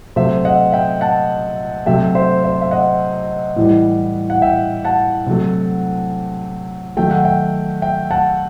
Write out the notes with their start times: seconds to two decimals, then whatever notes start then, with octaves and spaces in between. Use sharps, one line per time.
0.16 C3 F#3 A3 C5 E5
0.45 D#5 F#5
0.73 E5 G5
1.01 F#5 A5
1.86 C3 F#3 A3 E5 G5
2.15 C5 E5
2.44 C5 E5
2.61 E5
2.71 D#5 F#5
3.56 A2 E3 G3
4.30 F#5
4.42 E5 G5
4.85 F#5 A5
5.26 C3 F#3 A3
6.97 D#3 F#3 A3 G5
7.11 F#5
7.25 E5 G5
7.82 E5 G5
8.11 F#5 A5